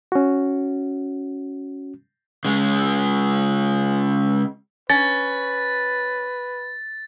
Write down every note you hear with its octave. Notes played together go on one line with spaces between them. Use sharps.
C#4 F#4
C#3 G#3
C#4 B4 A6